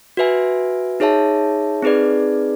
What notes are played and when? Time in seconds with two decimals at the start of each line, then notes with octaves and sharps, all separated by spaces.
0.17 F#4 B4 E5 G#5
1.00 D#4 G#4 C#5 E5 A5
1.82 C4 D#4 G#4 B4 D5